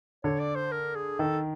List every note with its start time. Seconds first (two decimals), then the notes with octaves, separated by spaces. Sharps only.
0.24 D3 C#5
0.40 D5
0.55 C5
0.72 A#4
0.95 G#4
1.19 D#3 A4